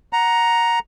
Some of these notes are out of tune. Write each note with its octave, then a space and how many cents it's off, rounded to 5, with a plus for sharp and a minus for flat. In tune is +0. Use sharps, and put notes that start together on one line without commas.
F#5 +0 A#5 +5